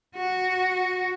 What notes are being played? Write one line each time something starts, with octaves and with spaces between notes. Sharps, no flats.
F#4